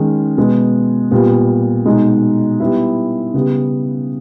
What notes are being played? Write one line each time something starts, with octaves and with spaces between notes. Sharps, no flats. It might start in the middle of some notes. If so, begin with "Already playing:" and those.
Already playing: D#3 G#3 C#4 G#4
B2 G#3 B3
A#2 G3 B3
B2 G#3 D#4
G3 B3 E4
C#3 G3 B3